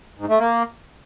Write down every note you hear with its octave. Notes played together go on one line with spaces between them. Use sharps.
G#2
A3
A#3